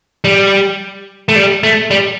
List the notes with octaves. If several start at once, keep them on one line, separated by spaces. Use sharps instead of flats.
G3
A3
G3
A3
G3